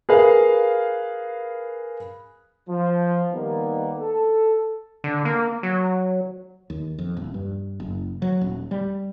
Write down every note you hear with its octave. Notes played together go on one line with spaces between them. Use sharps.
G#4 A#4 B4 F5
F3
D#3 G3 A#3 B3
A4
D3
A#3
F#3
D#2
F2
D#1
G2
F#1
F#3
D#1
G3